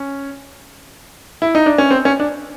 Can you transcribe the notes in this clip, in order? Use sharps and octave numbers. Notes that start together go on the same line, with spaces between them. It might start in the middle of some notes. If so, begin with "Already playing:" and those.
Already playing: C#4
E4
D#4
D4
C#4
C4
C#4
D4